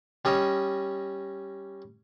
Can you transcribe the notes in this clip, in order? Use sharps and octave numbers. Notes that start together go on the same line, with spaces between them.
G3 C#4 D#5